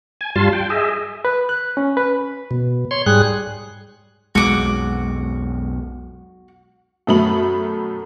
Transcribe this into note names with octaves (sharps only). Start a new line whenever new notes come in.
G#5
G2 G3 F4 A5 C6
G5
G#4 D#5 E5
B4
F#6
C#4
B4
B2
C#5 C6
G#2 G3 G#4 F#6
B1 F2 G#3 F#4 D6
F#2 B2 A3 A4 B5 F#7